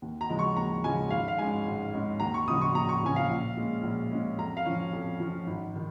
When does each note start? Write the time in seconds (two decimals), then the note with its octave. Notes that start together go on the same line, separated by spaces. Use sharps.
0.02 D#2
0.21 A#5
0.29 C#3 F3 G#3 C#4
0.39 C#6
0.56 D#2 A#5
0.84 C#3 F3 G#3 C#4 G#5
1.10 G#1 F5
1.28 F5
1.38 G#2 G#3 C#4 G#5
1.65 G#1
1.93 G#2 G#3 C#4
2.20 D#2 A#5
2.34 C#6
2.48 C#3 F3 C#4 D#6
2.61 C#6
2.75 D#2 A#5
2.89 C#6
3.03 C#3 F3 C#4 G#5
3.16 F5
3.30 A#1
3.56 A#2 G#3 C#4
3.83 A#1
4.11 A#2 G#3 C#4
4.38 F2 A#5
4.57 F5
4.66 F3 C#4
4.93 F2
5.20 F3 C#4
5.47 G#1
5.76 D#3